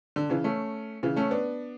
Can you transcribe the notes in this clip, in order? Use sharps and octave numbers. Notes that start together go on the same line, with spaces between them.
D3
C#3 E3
A3 C#4
C#3 E3
A3 C#4
B3 D4